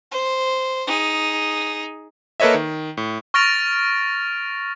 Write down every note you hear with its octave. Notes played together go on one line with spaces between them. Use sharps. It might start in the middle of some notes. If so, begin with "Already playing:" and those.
C5
D#4 G#4
A#3 A4 B4 C#5 D#5 E5
D#3
A2
C#6 F6 A6 A#6 D7 F7